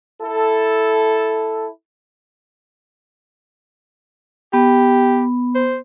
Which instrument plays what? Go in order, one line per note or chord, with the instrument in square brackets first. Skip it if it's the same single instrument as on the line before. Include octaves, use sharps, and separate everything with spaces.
[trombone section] E4 A4
[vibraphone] B3 [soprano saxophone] G4
[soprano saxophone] C5